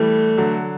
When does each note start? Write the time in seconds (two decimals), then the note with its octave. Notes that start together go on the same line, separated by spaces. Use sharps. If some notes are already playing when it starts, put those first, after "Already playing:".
Already playing: E3 G3 A3
0.38 D3 F#3